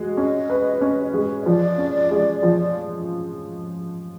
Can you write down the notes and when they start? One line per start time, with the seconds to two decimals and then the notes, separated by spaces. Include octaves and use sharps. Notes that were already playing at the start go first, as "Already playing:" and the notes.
Already playing: G#3 F#4
0.17 C#4 D#5
0.50 B4
0.81 C#4
1.14 G#3
1.42 D#5
1.46 F3 D5
1.78 C#4
2.11 G#3
2.43 F3